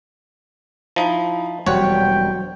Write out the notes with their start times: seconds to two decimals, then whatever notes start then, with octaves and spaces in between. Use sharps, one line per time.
0.96 F3 D#4 E4 B5
1.66 E1 F#3 G3 F#4 C5 C#5 F#5 G5